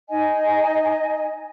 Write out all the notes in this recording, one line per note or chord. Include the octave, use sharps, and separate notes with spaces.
D#4 D#5 G#5